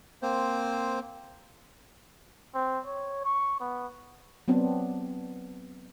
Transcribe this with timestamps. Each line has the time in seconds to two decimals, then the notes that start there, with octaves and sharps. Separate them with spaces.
0.22 A#3 C4 C5
2.55 C4
2.86 C#5
3.25 C#6
3.61 B3
4.48 F#3 B3 C4 D4